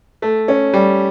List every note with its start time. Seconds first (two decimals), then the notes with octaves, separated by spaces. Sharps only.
0.22 A3
0.48 C#4
0.73 G3